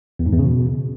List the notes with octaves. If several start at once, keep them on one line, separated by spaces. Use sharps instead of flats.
E2
G#2
E2
C#3
B2